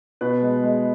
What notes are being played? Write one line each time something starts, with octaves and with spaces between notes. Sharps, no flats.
B2 B4
G#3
G#3